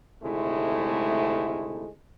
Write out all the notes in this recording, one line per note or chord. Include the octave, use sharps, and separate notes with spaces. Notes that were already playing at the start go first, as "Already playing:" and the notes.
G#1 D2 C3 G#3 A3 E4